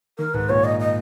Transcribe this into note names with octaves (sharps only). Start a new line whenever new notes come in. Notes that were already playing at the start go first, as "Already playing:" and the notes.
D#3 A#4
G#2 B4
A#2 C#5
D#5
D#5